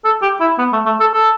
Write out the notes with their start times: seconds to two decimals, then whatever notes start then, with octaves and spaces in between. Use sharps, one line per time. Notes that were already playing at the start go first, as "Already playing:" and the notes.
0.05 A4
0.22 G4
0.40 E4
0.59 B3
0.73 A3
0.86 A3
1.00 A4
1.13 A4